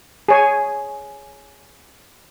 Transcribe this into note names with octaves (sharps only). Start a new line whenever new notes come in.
G#4 C#5 G#5